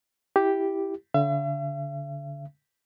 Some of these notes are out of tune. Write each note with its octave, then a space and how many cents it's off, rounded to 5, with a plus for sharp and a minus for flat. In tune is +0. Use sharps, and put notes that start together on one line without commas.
E4 +0 G4 +0
D3 -30 E5 +45